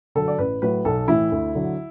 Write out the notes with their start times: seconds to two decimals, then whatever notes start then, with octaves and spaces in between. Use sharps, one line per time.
0.15 D3 F#3 A4
0.28 D5
0.38 A1 B4
0.62 A2 F#3 B4
0.85 B1 A4
1.08 A2 E3 E4
1.32 D2
1.55 D3 F#3